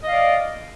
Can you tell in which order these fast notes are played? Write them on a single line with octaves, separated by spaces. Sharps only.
D#5 F5 D5